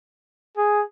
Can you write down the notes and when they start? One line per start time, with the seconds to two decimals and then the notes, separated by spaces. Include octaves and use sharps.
0.58 G#4